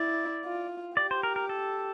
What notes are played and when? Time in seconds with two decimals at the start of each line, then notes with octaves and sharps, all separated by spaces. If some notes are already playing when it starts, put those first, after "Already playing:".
Already playing: E4 D5
0.45 F4
0.97 G4 D5
1.11 C5
1.23 A#4
1.36 A#4
1.49 A4